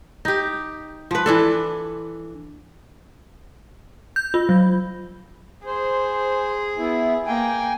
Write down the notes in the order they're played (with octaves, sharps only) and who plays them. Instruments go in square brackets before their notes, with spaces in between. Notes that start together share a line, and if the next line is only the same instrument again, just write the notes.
[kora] D#4 G4
F3 B4
E3 D4 A4
[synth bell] G6
F4
F#3
[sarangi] G#4 [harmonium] C5
[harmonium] B3 E4
[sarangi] A#3 [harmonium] G5 G#5